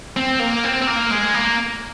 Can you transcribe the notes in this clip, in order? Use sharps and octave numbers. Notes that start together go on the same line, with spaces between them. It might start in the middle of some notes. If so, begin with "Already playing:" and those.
C4
A#3
C4
C4
A#3
G#3
A#3